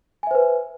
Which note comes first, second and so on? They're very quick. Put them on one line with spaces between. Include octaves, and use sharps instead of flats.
G#5 E5 C5 B4